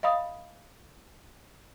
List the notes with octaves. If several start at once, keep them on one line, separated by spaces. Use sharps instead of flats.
D#5 F5 B5 D#6